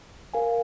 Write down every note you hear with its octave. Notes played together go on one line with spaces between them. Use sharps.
A#4 F5 G#5